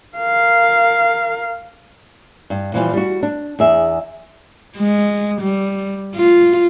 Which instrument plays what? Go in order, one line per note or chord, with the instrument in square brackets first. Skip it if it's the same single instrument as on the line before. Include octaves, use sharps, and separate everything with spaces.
[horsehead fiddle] A#4 F5
[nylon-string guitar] G2
A#2 E3 F3 G3
G3 F#4
D4
E2 G#4 E5
[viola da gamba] G#3
G3
F4